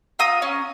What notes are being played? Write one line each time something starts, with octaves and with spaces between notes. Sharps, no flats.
F4 A#5 D#6
C#4